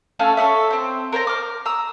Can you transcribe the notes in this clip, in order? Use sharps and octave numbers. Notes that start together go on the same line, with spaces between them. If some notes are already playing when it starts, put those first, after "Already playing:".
A3 C#4 A4 F5
A4 C#5 D5 E5
C4 C5
A#4 C5 A5 A#5
D6 F6
A#5 D#6 E6